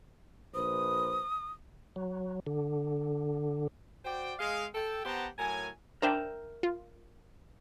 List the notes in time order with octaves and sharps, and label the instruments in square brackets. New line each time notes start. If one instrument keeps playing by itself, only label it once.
[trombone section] A#1 B4 C5 [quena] D#6
[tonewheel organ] F#3
D3
[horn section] F#4 C5 D5 G5
G#3 F5
A4 G5
B3 G4 C5 F#5 A5 A#5
A2 F#3 A#4 G#5
[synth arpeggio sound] D4 C5 [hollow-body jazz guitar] A#4 E5 G5
[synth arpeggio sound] F4